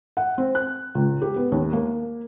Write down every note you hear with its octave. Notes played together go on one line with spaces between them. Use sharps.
F#5
C4
F#6
C#2
G4
B3
D#2
A#3